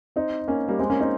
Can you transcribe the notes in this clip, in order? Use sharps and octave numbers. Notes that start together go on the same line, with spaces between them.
C4 D#4
A#3 C#4
G3 A#3
G#3 C4
A#3 C#4
C4 D#4